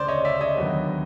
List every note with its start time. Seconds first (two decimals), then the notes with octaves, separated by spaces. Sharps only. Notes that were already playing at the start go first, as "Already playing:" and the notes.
Already playing: D2 C#3 C5 D5
0.08 C#5 D#5
0.25 D5 E5
0.41 C#5 D#5
0.58 D#2 D3 F#3 B3